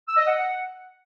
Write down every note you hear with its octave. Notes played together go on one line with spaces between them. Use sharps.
E6
D#5
F#5